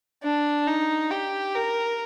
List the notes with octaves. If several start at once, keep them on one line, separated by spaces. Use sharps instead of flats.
D4
D#4
G4
A#4